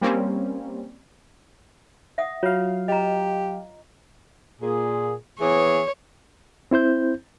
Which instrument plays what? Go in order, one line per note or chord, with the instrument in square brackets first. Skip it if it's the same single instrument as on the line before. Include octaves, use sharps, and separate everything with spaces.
[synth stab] G3 A#3 C4 C#4
[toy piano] E5 F#5 D#6
[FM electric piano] F#3 F5 [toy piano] F4 C#5
[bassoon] G4 [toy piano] D#5 A#5
[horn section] A#2 G#4
[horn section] E3 B3 G#4 [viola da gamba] C#5
[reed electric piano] C4 E4 C5 G6